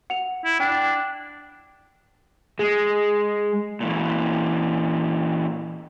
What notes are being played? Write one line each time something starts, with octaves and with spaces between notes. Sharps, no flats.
F#5 F7
E4
D4 G5
G#3
A#2 E3